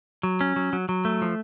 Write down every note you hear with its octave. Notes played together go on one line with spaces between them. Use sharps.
F#3
C#4
F#3
F#3
F#3
A3
F3